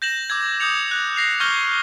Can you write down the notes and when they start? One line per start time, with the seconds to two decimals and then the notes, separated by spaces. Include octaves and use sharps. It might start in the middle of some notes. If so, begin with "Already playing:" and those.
0.02 G6 A#6 E7 F#7
0.30 D6 E6 G#6
0.60 D#6 G6 G#6 C#7 F7
0.91 F#6
1.16 A#6 C7 F7
1.40 C#6 F6 G6 G#6 A#6 G7